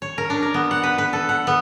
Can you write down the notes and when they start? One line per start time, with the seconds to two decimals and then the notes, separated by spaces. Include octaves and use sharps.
0.02 C#5
0.18 A#4
0.30 D4
0.42 A#4
0.54 B3
0.71 F#5
0.83 B4
0.98 B4
1.13 A4
1.29 F#5
1.47 B3